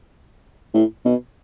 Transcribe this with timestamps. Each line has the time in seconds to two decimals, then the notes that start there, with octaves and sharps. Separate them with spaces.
0.74 A2
1.05 B2